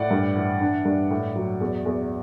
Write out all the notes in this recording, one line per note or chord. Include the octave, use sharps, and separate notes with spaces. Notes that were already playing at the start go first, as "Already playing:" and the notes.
Already playing: A2 D5 F#5
G2
E3
D4
G2
A2
F#3
E2
E2